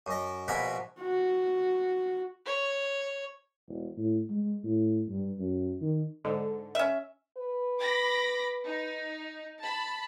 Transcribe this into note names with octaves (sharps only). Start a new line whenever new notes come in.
F#2 D#5
A#1 B2 A#4 B4 F#5 G#5
F#4
C#5
E1
A2
G#3
A2
G2
F#2
D#3
G#2 D3
C#4 E5
B4
B5 D6 A#6
D#4
A5 B5